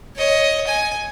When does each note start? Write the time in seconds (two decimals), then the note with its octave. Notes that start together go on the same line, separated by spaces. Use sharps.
0.16 C#5 D#5
0.67 G#5